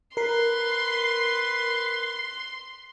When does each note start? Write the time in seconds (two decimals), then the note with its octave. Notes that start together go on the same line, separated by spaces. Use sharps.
0.17 A#4 B4 C6 C7